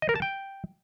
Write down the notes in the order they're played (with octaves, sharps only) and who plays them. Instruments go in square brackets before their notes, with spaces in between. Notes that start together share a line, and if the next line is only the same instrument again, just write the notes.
[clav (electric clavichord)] D#5
A#4
A5
G5